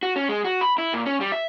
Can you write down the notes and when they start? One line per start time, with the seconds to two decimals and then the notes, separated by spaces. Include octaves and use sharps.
0.03 F#4
0.16 C#4
0.29 G#3
0.45 F#4
0.61 B5
0.78 E4
0.94 A#2
1.06 C#4
1.21 G3
1.32 E5